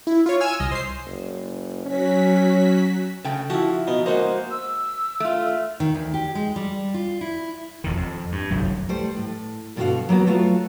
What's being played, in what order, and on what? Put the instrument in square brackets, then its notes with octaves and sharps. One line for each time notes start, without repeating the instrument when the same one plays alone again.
[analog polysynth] E4
F4 C#5
G#5 E6 F6 G#6
C2 D#5
C5 C7
[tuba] F#1
[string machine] F#3 F#4 B6 [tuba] C#4
[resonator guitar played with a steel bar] C#3 A3 G5
[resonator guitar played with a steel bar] F3 E4 [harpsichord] F#4
[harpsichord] B2 B3 [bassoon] D#4
[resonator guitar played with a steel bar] G#3 F#4 D#5 [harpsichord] A#3 [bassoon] C5
[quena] E6
[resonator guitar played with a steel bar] A3 F4
[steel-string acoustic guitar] D#3
D2
G4
G#3
G3
F4
E4
[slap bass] D#1 E2 D#3
F2
G2
G1 C2 F#2 F#3
[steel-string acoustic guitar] G3 A3 C5
A2
G2 B2 D3 A#3 F#4 F5
F#3 A#3 B3 F#4
F#3 A3 F4 F#4 F5